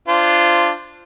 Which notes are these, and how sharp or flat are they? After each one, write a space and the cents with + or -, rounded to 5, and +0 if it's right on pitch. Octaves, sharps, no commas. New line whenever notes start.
D4 +0 F4 -20 C5 +0